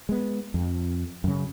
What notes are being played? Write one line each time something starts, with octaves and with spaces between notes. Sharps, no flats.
G#3 B3
F2
F#2 C#3